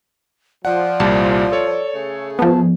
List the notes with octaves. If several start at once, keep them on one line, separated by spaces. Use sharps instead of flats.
F3 D5 F#5
C2 A#2 G3 A5
A4 C#5
C#3 A3 G#4
F3 B3 A5